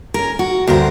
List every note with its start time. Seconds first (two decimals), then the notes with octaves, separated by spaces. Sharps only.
0.14 C#4 A#4
0.39 F#4
0.67 D2 G2 A#4 C5